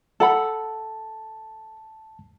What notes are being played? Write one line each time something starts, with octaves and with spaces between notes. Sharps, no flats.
A4 F#5 A5 B5